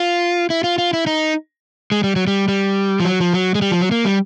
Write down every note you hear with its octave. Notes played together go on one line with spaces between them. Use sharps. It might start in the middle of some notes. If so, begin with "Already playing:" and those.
Already playing: F4
E4
F4
F4
E4
D#4
G#3
G3
F#3
G3
G3
F3
F#3
F3
F#3
G#3
G3
F3
F#3
A#3
G3